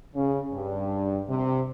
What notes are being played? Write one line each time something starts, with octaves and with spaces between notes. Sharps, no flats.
C#3
G2
C3